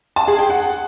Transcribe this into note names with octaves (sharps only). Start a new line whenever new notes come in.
A5
G#4
G5
F#5